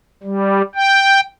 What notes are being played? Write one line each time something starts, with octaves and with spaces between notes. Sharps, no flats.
G3
G5